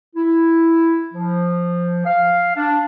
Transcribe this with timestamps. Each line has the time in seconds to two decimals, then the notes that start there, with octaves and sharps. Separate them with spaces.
0.15 E4
1.13 F3
2.06 F5
2.55 D4